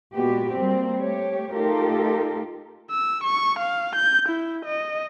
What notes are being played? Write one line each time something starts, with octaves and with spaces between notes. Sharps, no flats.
A#2 G#3 B3 F#4 G4
G3 A#3 C4
A3 G4 C#5
A3 D#4 F4 G4 A4 A#4
E6
C#6
F5
G6
E4
D#5